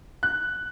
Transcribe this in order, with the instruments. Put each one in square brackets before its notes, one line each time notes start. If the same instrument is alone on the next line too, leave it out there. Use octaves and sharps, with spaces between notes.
[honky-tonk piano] F#6